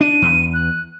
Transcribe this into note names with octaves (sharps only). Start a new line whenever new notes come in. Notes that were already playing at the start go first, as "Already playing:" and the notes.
D4 D#7
E2
F#6